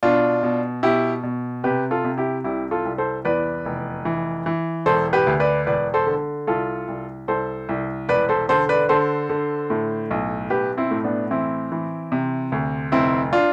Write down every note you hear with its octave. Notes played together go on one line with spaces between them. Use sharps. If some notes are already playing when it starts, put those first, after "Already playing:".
B2 D4 F4
B2
B2 E4 G4
B2
C3 G4 B4
F4 A4
C3
E4 G4
C2 E4 G4
F4 A4
C2
A4 C5
E2 B4 D5
F1
E3
E3
E1 A4 C5
G4 B4
D2
B4 D5
E1 B4 D5
A4 C5
D3
C2 F4 A4
C2
C2 A4 C5
C2
E1 B4 D5
A4 C5
D3 A4 C5
B4 D5
D3 A4 C5
D3
A2
B1
B1 G4 B4
C4 E4
A2
B3 D4
E3 C4 E4
E3
C3
D2
F1 C4 E4
D4 F4